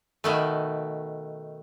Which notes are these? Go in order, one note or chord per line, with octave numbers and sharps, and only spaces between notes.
B2 D#3 A3